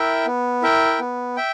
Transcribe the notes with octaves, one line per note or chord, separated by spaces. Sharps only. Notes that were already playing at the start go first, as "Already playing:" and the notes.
Already playing: E4 A#4 E5 G5
B3
E4 A#4 E5 G5
B3
E5 G5